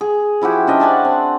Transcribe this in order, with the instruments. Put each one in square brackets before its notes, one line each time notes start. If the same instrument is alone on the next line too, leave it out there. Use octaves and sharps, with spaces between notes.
[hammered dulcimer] G#4
F3 E4 F#4 G4
C#4 D4 D#5 E5
D5 F#5 G#5 A5
C4